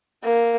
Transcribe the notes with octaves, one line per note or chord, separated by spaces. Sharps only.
A#3